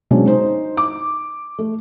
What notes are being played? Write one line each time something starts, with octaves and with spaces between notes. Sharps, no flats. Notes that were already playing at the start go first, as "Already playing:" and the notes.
C3 F#3 G#3 B3 C#4 D4
D#4 C5
D6
A3